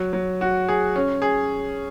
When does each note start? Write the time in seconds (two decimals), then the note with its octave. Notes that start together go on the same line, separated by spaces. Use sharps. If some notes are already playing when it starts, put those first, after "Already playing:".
Already playing: F#3
0.13 F#3
0.41 F#4
0.68 G#4
0.96 C#4
1.22 G#4